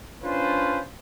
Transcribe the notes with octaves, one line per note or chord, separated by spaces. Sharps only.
C#4 D4 F4 B4 C5